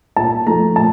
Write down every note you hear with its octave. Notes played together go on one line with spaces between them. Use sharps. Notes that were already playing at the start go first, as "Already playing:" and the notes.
A#2 A5
F3 A3 A#5
A#2 A5